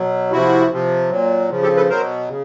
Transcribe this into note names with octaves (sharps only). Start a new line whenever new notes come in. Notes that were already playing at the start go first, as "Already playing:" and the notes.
Already playing: B2 F#3
C3 F3 E4 F#4
C3 F3
A#2 F#3
C#3 F3
G4 A4
A4 B4
B2 F#3 A#4 C5
C#3